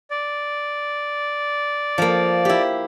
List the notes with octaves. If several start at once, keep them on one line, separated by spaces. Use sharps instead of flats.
D5
F3 A#3
E4 G4